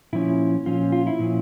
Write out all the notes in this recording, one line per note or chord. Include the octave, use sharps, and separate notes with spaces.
A#2 F3 C#4 E4
A#2 F3 C#4 F4
F4
E4
A#2 F3 C#4